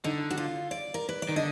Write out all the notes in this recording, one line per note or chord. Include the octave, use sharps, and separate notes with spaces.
D3 D#4
F#4
F4
D5
A#4
B4
D5
D#3
D3 D#5